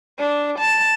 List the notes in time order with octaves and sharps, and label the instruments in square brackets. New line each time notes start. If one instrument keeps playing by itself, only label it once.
[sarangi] D4
A5